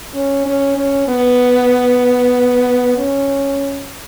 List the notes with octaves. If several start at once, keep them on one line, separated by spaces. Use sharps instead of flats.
C#4
C#4
C#4
B3
C#4